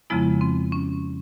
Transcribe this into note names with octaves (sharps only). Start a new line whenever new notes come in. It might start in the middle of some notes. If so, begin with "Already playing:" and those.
F2 C#3 F3 G#3 B3 E4
C4
C#4